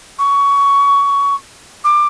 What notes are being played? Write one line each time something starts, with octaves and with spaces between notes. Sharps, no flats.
C#6
D6